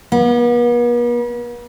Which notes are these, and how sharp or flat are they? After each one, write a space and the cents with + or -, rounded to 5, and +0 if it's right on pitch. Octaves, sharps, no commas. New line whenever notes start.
B3 -45